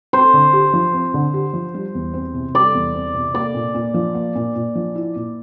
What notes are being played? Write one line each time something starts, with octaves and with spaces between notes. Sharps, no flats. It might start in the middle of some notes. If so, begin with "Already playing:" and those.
C4 C5
D3
G4
F3
C4
D3
G4
F3
G3
E2
C4
C3
G3 D5
E2
C4
C3
A#3 D5
A#2
A#2
F3
A#3
A#2
A#2
F3
E4
A#2